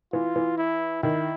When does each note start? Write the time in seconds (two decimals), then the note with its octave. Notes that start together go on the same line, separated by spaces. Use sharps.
0.13 E3 F4
0.36 E3
0.58 E4
1.03 D#3 E4